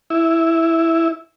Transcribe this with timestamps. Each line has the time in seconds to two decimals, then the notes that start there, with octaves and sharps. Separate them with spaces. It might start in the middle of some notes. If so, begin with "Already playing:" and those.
0.10 E4